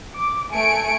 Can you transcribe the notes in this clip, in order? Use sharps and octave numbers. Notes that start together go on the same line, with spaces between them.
D6
A3 G#5 C#7 D7